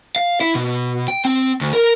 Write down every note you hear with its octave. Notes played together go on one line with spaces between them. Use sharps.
F5
E4
B2
G5
C4
D2
A#4